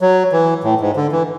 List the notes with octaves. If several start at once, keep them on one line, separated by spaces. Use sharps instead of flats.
F#3
E3
A2
G#2
D3
E3